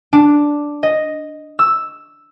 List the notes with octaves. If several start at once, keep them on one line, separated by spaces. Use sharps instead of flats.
D4
D#5
E6